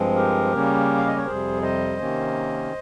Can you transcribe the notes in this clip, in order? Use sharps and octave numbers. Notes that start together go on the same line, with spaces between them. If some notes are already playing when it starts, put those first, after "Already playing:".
Already playing: G2 F3 G#3 C4
G4 A#4
C#3 G3 A#3 C#4
F5
D#5
C#5
F2 C3 G3 G#4 C5
C5 D#5
C3 D#3 A#3 C#4